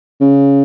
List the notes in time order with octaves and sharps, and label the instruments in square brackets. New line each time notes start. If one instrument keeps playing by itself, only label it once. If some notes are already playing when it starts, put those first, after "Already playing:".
[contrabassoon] C#3